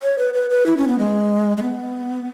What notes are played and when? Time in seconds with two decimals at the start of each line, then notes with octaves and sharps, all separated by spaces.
0.03 C#5
0.18 B4
0.34 B4
0.50 B4
0.66 E4
0.77 C#4
0.88 B3
0.99 G#3
1.57 G#3
1.62 B3